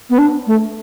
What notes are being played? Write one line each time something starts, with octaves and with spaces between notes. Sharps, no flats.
B3
D4
A3